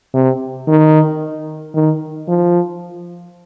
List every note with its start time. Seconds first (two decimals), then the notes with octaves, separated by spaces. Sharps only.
0.14 C3
0.68 D#3
1.75 D#3
2.28 F3